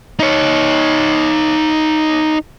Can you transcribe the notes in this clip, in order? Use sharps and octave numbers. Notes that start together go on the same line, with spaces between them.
D#4 C#5